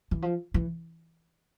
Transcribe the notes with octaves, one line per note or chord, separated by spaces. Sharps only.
E3
F3
E3